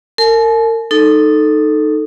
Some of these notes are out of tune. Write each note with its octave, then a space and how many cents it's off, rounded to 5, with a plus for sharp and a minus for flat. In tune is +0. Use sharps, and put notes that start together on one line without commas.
A#4 -35 A5 -45
D#4 -10 A4 +0